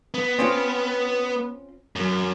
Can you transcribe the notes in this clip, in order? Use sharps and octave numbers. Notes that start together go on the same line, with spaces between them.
B3
C4 C#4 F4
F#2